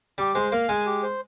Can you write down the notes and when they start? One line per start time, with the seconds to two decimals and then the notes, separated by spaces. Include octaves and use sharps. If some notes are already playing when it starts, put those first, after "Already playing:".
0.18 G3 G4
0.35 G#3 C5
0.52 A#3 F5
0.69 G#3 G#5
0.86 G4
1.03 C5